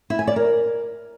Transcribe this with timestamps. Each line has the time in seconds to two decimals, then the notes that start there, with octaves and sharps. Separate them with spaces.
0.10 E4
0.19 G#5
0.27 D5
0.36 A#4